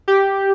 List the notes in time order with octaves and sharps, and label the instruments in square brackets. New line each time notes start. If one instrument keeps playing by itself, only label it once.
[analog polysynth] G4